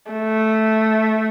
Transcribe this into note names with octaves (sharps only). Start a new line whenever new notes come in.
A3